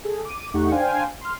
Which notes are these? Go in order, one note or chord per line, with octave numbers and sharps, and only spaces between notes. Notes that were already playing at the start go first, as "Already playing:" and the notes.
G#4 A4
D6 D#7
E2 A3 D#4 G4 F#5 C#6
D4 C5 F5 G5 G#5
C6 F6